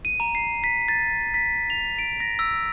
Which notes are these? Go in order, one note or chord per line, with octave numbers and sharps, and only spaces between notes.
D#7
A#5
C7
B6
A6
B6
F7
D7
A#6
E6